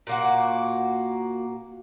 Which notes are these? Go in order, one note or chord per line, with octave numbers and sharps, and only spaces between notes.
A#2 A#3 F#4